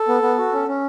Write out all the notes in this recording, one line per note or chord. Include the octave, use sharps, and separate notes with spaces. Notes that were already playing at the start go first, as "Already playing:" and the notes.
Already playing: A4
B3
B3
F#4
C#4
C#4